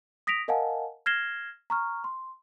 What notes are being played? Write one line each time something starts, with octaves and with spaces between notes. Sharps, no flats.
D#6 A#6 B6 D7 F7
A#4 D#5 F5 F#5 G#5 A5
F6 G#6 A#6 C7 E7 G7
A#5 C#6 F6
C6